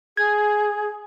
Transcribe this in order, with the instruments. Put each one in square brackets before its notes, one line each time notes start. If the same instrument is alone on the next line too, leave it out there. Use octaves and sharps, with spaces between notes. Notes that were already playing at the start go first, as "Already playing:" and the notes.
[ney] G#4 [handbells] G#6